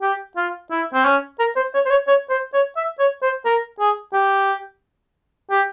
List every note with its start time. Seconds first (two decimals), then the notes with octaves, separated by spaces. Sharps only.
0.02 G4
0.37 F4
0.71 E4
0.94 C4
1.05 C#4
1.39 A#4
1.56 C5
1.74 C#5
1.86 C5
1.90 C#5
2.07 C#5
2.30 C5
2.53 C#5
2.77 E5
2.99 C#5
3.22 C5
3.45 A#4
3.79 G#4
4.13 G4
5.51 G4